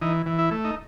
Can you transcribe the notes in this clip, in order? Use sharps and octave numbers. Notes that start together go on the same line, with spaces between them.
E3 D#4
E3
E4
A3
D#4